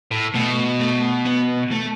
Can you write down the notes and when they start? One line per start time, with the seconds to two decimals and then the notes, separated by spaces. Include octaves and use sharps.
0.11 A2
0.35 B2 A3
0.80 A3
1.26 B3
1.71 A3